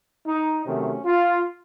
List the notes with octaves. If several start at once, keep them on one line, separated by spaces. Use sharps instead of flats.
D#4
C3 D#3 F#3 A3 C#4
F4